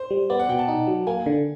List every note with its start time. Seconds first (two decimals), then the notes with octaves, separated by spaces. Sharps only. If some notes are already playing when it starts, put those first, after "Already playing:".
Already playing: C5
0.10 G3
0.30 B3 D5
0.40 F#5
0.49 B2 G5
0.59 A5
0.68 D#4
0.87 F#3
1.07 A#3 G#5
1.26 D3